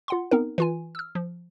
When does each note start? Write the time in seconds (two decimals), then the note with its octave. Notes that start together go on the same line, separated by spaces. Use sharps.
0.08 F4 F#5 C6
0.31 B3 C4 D#4 A#4
0.58 E3 F4 G#5
0.95 E6 F6
1.15 F3